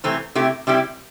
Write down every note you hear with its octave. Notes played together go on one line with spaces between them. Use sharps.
C3 E3 A3 C4
C3 A3 E4 G4
C3 G3 E4 G4